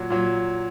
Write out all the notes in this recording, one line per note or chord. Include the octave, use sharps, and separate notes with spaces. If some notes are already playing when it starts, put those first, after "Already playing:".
Already playing: A#2 F#3
A#2 F#3